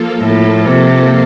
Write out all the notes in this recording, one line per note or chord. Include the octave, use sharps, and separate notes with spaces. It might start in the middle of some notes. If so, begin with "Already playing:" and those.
Already playing: F3 A#3 F4 A4
A2
C3